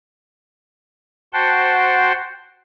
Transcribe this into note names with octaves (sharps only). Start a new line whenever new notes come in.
F#4 C5 F#5 G5 A5 C6